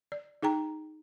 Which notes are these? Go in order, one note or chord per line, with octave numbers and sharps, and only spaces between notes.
D5
D#4 G#4 G5 A#5